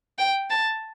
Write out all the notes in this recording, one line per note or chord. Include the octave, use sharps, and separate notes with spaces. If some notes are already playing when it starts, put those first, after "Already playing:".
G5
A5